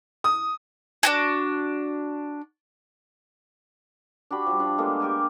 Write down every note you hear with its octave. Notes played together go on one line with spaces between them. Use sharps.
D#6
D4 F#4 G#4
D4 F#4 G4 B5
F3 G3
D4
G#3 A#3 B3 A4
G4 A#4 G#5